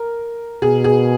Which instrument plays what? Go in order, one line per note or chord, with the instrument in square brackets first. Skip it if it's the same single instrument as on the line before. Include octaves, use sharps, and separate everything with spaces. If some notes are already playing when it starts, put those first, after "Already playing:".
Already playing: [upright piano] A#4
[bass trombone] B2 [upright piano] G#4
[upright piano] G#4